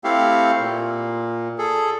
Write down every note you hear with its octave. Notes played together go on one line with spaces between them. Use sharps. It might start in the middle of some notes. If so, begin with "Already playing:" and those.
A3 C4 E4 G4 A4 F5
A#2
G#4 A4